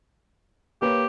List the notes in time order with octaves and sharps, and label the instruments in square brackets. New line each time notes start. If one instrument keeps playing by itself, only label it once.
[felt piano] A#3 B4 C#5 [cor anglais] G4